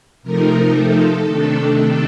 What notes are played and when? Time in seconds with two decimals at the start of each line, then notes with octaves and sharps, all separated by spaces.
0.23 C3 F3 A3 D#4 A#4
0.75 A4
1.26 C3 D#3 A3 D4
1.78 A4